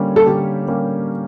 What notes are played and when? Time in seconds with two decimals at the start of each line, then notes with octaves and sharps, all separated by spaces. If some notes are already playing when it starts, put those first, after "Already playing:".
Already playing: D3 G3 A#3 C#4
0.16 A4
0.26 D3 G4
0.68 G3 A#3 C#4